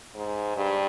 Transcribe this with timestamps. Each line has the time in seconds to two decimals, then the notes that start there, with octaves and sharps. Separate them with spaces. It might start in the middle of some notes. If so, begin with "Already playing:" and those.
0.15 G#2
0.57 G2